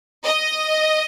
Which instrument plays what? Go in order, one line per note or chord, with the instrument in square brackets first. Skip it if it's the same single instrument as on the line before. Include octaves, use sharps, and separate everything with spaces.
[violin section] D#5